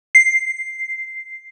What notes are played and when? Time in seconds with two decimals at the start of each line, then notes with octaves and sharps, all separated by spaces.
0.15 C7